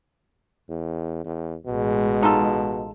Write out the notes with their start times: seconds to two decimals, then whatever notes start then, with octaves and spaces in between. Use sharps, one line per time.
0.69 E2
1.25 E2
1.66 A1 B2 G#3
2.23 D#4 F4 A4